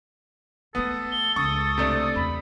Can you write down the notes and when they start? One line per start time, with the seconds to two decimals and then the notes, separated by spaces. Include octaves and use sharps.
0.75 E3 A3 B3 A4 D#6
1.12 G7
1.36 C#2 C#6 D#6
1.78 C3 A3 D4
2.16 E2 B5